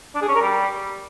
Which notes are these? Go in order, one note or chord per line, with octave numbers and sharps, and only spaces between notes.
D4
G#4
C#4
A#4
G3